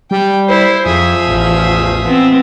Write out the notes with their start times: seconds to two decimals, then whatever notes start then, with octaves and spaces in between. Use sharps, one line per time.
0.11 G3 G5
0.49 E4 C5
0.86 F2 F3 G#4 E5
1.27 A1 E2
2.05 B3 C4